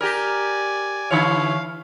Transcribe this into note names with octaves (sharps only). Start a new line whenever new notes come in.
G4 A#4 D5 G#5
D3 E3 C#5 F5